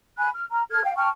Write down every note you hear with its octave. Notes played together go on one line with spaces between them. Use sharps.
G#5 B5 F#6
F6
A#5 F6
A4 F6 G#6
F5 G5
G5 A5 C#6 F6